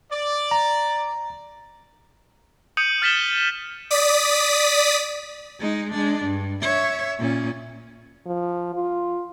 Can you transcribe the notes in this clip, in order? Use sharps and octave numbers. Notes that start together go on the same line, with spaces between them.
D5
A#5
D#6 G6 C#7 D#7 F#7
F6 A6 B6 E7 G7
D5 D#6 B6
G#3 D#4
G#3 D4
G2
C#5 E5
A#2 C#4
F3
F4